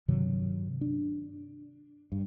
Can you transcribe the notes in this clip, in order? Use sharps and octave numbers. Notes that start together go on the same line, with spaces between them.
G2 C3 D#3 F#3
D4
G2